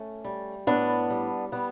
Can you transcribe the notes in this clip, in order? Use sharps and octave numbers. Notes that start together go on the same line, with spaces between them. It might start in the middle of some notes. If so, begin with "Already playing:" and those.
Already playing: A3 C#4
G3
A2 B3 D4
G3
G3 B3